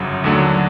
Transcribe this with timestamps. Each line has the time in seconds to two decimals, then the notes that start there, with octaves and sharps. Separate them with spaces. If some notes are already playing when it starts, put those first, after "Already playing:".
Already playing: G1 F#2 C#3 F#3
0.24 D#2 D3 F#3 A3 D4